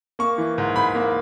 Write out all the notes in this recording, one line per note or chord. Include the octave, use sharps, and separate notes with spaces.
A#3 C#6
E3
G#2
G#2 B5
A#3